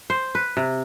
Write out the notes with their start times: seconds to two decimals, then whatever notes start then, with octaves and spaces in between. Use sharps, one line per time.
0.10 C5
0.35 B4
0.57 C3